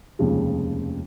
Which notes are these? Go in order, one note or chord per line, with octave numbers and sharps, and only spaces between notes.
F1 D#2 C#3 F3 G#3